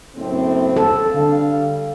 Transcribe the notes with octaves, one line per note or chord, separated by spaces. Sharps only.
F#1 A2 C4
A4
D3 G3 F5